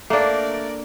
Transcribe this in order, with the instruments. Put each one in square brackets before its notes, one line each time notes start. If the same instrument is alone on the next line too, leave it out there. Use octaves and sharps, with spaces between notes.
[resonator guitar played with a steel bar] A3 [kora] A#3 D4 [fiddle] A#4 D5